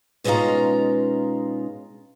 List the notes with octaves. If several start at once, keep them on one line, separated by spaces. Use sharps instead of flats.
B2 G#3 C#4 D#4 F4 A#5